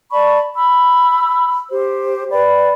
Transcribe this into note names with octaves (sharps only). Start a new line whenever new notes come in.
D5 A5 B5 C#6
B5 E6
G4 C5
B4 D5 G5 B5